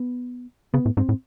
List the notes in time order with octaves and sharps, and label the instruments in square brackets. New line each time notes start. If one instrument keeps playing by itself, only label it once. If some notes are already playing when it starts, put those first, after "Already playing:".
Already playing: [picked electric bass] B3
[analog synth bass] C#3 [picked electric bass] B3
[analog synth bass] A2
[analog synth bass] G#2 [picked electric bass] C4
[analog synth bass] A2